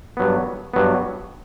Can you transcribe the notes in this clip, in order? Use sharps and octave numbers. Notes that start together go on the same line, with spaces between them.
G2 F#3 B3
G2 F#3 B3